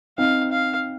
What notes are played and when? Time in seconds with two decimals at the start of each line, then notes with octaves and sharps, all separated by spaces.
0.18 C4 D#4 F5
0.52 F5